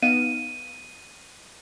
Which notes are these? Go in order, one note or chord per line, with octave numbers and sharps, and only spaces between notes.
B3 D#4 F5 D#7